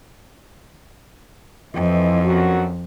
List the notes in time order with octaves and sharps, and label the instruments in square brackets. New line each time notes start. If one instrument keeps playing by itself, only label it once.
[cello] F2 [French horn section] E3 F4 D#5
[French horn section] F#2 F#4